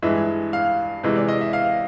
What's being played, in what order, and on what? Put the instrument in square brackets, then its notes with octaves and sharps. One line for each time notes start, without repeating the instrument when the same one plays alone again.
[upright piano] G2 E3 G#3 E5
F5
C3 E3 G#3
D5
D#5
E5
F5